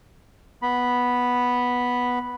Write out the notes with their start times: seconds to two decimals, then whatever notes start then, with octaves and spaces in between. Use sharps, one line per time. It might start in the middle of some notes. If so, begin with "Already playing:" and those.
0.62 B3 B5